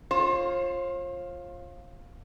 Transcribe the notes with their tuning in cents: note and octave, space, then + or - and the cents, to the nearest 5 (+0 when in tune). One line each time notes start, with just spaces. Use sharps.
F4 +5 C5 +45